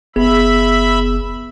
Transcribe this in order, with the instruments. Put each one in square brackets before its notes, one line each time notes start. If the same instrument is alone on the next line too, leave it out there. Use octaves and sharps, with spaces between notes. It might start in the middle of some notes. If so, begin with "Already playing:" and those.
[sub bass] F#1 [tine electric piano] B3 G#4 [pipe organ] E5 B5